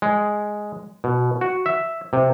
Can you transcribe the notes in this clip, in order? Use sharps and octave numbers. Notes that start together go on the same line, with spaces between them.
G#3
B2
F#4
E5
C3